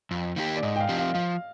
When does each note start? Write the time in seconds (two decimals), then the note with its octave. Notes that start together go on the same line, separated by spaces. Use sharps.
0.11 F2
0.36 D#3 A#3 D#4 G4
0.57 D5
0.63 G#2 D#5
0.76 G5
0.81 F5
0.89 F3 C4 G4
0.98 F5
1.14 F3 F5